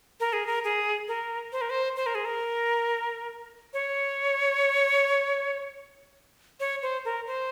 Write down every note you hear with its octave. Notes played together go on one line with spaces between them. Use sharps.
A#4
G#4
A#4
G#4
A#4
C5
A#4
C5
C5
A#4
G#4
A#4
C#5
C#5
C5
A#4
C5